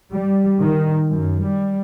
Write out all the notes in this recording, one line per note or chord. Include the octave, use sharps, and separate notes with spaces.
G3
D#3
F#2
G3